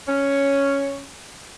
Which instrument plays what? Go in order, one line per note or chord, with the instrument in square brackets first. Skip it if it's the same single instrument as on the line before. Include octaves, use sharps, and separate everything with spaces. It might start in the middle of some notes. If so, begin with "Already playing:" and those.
[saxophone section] C#4